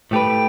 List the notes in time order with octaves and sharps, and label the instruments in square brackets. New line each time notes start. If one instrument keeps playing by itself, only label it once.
[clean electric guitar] A2 A3 G4 B4 [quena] G5